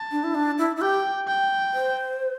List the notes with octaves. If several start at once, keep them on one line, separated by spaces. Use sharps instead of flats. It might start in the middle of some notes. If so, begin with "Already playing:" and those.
Already playing: A5
D4
E4
D4
E4
E4
G4 G5
G5
C5